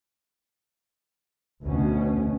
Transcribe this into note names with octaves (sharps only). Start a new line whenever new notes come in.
D2 B2 C#4